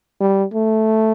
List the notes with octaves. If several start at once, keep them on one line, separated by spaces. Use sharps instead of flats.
G3
A3